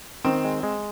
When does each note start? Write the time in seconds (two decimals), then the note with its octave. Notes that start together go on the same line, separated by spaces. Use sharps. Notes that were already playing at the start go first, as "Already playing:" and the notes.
0.25 D#3 C4
0.44 G#3
0.63 G#3